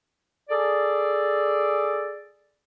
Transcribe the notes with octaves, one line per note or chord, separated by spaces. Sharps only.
G#4 A4 D5